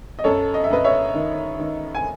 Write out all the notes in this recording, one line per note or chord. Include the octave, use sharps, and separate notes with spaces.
D#5
F#2 A4 C#5
D#5
E5
F#2 B4 D#5
C#5 E5
D#3
D#3
G#5